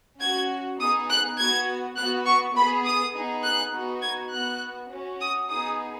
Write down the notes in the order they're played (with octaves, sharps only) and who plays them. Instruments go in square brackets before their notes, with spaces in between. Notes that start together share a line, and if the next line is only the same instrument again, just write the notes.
[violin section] C#4 F#4 G#6
B3 D#4 G#4 D#6
F#6
B3 F#4 G#6
B3 F#4 F#6
C#6
B3 G#4 B5
D#6
B3 D#4 G#4
F#6
B3 D#4 F#4
G#6
B3 F#4 F#6
C#4 F#4
D#6
B3 D#4 G#4 D#6